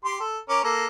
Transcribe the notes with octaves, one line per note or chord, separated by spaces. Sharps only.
G4 C6
A4
C#4 A#4 D6
A#3 A4